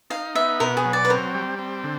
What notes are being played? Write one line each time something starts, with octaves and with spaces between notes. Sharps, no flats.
D#4 F5
B3 E5
B2 A#4
G#4
F#3
D5
B4
C4 A#4
G3
C4
D3